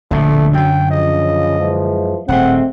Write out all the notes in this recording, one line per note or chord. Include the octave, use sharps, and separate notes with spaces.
D1 A#1 B2 D3 A3
F#2 F#3 G5
C#3 F3 D#5
E3 F3 G#3
D#1 A2 G#3 A3 C4 F#5